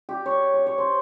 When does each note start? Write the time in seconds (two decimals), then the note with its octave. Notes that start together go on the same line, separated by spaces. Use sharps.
0.09 G4
0.26 C#5
0.54 C#5
0.66 C#5
0.78 C5